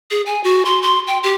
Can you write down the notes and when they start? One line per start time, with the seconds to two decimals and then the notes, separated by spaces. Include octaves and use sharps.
0.11 G#4
0.26 G#5
0.44 F#4
0.65 C6
0.82 C6
1.07 G5
1.23 G4